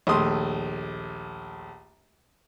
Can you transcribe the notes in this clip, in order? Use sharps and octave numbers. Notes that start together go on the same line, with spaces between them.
A#1 D#2 A3 C6 D#6